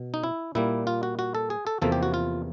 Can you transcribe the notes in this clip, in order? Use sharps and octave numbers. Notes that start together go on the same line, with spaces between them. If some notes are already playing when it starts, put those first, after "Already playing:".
Already playing: B2
D#4
E4
A#2 G3 A#3 E4
F4
F#4
F#4
A4
G#4
A4
E2 C3 F3 A#3 A4
G4
F#4
F4